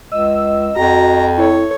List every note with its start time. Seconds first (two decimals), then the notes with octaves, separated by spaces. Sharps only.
0.12 C#2 D#5 E6
0.76 F2 F#4 A#5
1.38 E4 A4 C#5